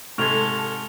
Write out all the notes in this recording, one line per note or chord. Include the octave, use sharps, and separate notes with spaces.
G#2 C3 A4 C#6 F6 G#6 F7